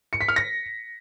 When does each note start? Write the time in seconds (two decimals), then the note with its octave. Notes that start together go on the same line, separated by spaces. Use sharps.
0.13 C#7
0.21 B6
0.28 F6
0.36 A#6